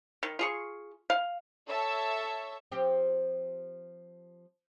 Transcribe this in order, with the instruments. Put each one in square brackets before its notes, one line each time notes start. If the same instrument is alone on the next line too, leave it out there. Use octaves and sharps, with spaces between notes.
[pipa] D#3
F4 G#4 C#6
F5
[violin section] A4 C#5 E5 A5 E6
[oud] F3 C4 G4